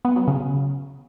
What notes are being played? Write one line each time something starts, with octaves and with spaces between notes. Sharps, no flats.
B3
F#3
C#3